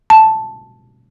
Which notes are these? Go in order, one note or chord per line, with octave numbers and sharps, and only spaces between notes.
A5